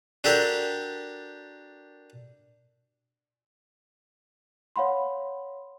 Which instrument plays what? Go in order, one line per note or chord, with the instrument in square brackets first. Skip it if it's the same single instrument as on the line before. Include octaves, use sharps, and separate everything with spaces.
[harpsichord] D4 F#4 G4 A4 A#4
[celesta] C#5 F5 F#5 B5 C6